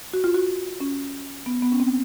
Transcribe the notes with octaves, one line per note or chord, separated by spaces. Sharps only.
F#4
F4
F#4
C#4
B3
B3
C#4
C4